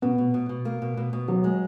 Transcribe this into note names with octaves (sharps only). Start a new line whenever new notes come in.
B2 B3
B2
B2
B2
A#3
B2
B2
B2
D#2 F#3
G#3